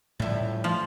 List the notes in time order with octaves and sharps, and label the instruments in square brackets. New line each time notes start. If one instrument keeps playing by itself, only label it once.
[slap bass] A2 F3 [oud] G3 E4
[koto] F3